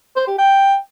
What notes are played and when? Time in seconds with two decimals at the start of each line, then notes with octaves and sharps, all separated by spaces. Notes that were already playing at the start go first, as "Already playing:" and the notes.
0.16 C5
0.28 G4
0.39 G5